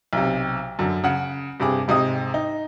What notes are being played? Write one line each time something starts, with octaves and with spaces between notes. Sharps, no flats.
B1 C3
F#2 D3
C#3 F#5
G2 C3 G#4 D6
G#2 C3 G#3 D#5 D#6
D#4